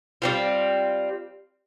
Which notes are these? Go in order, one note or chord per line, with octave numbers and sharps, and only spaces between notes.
G3 C4 F4